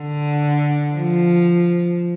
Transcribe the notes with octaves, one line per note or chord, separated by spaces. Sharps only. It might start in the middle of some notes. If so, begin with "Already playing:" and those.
Already playing: D3
F3